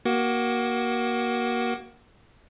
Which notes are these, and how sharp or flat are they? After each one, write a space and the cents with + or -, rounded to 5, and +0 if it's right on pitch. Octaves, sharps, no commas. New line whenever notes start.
A#3 +25 F#4 +20